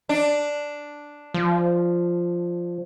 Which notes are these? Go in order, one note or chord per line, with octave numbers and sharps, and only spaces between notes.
D4
F3